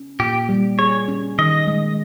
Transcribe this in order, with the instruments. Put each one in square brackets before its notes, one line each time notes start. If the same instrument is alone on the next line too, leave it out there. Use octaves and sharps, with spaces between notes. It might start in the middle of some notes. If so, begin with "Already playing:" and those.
Already playing: [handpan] C#4
[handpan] A#2 [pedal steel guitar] G4
[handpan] G3
[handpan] G#4 [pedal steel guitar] C#5
[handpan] C#4
[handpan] D#3 [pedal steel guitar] D#5
[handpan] G#3